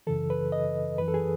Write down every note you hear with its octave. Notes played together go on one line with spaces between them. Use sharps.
F#2 C#3 E3 A4
B4
D#5
F#2 E3 B4
A4
G#4